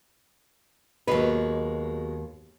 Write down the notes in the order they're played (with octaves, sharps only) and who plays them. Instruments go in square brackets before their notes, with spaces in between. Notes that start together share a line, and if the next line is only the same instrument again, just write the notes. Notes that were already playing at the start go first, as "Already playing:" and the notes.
[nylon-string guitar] D#2 B4 [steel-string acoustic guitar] B2 F#3 G#3